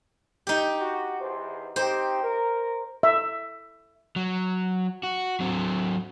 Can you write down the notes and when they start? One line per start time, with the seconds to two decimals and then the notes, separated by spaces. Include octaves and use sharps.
0.47 D#4 G4
0.79 F#4
1.20 E2 C5
1.76 C4 D#4 G4 C5
2.23 A#4
3.03 E5
4.16 F#3
5.03 F#4
5.40 F#3 C4